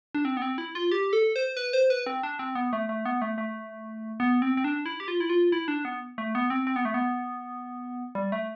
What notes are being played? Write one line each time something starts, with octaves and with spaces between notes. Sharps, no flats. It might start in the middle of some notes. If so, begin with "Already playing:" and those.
D4
C4
B3
C4
E4
F4
G4
A4
C5
B4
C5
B4
C4
D4
C4
B3
A3
A3
B3
A3
A3
B3
C4
C4
D4
E4
G4
F4
E4
F4
E4
D4
B3
A3
B3
C4
C4
B3
A3
B3
G3
A3